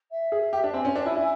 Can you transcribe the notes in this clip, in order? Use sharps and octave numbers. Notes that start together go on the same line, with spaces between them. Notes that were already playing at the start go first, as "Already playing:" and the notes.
E5
G#4
G4
D4
C4 G#5
C#4
D4
E4
E4